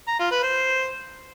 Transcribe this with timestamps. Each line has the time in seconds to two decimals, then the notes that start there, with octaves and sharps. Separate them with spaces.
0.08 A#5
0.20 F4
0.31 B4
0.43 C5